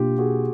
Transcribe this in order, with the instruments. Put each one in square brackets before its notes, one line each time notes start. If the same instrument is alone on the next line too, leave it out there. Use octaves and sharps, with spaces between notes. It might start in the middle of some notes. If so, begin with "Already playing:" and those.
Already playing: [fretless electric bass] B2 A#3 D4 [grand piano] F4 G4
[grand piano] F#4 G#4